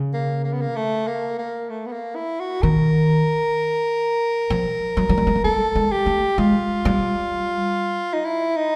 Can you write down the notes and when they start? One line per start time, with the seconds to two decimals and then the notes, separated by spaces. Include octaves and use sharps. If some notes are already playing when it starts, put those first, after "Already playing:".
Already playing: C#3
0.14 A#3
0.44 A#3
0.53 B3
0.61 A#3
0.76 A3
1.07 A#3
1.38 A#3
1.70 A3
1.86 B3
1.92 A#3
2.15 E4
2.40 F#4
2.62 D#3 A#4
4.50 F3
4.97 F#3
5.09 F#3
5.18 G3
5.27 G#3
5.35 A3
5.44 A#3 A4
5.75 G#3
5.92 G4
6.06 A3
6.38 G#3 F4
6.85 G3
8.13 D#4
8.25 E4
8.57 D#4